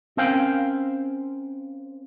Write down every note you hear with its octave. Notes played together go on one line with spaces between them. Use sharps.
C4 C#4 A#4 C5 F5 G5